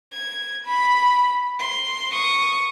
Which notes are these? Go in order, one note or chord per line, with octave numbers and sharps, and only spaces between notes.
G#6
B5
C6
C#6 D#6